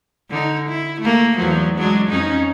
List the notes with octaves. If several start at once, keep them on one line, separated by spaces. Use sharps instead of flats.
D3 D#4
E4
A3 A#3
E2 F3 F#3
F#3 G#3 D4
F2 C#4 D#4